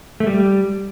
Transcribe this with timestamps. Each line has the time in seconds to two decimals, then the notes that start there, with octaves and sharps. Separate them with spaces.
0.20 A3
0.27 G3